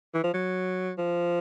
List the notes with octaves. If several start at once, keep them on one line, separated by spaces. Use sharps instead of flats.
E3
F3
F#3
F3